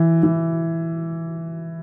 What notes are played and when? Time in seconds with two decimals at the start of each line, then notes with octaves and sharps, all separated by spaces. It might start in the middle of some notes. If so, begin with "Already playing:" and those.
Already playing: E3
0.23 E3